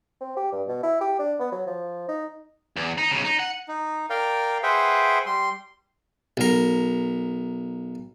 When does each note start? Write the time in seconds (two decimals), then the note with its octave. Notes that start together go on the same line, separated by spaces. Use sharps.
0.21 C4
0.37 G4
0.52 G2
0.68 B2
0.83 E4
1.01 G4
1.19 D4
1.40 B3
1.52 F#3
1.67 F3
2.08 D#4
2.76 E2
2.98 D#4
3.11 B1 C#3
3.25 D#4
3.40 F#5
3.68 D#4
4.10 A#4 D5 F5 G5
4.63 G#4 B4 C5 E5 F#5 G5
5.26 G3 C6
6.37 B1 A#4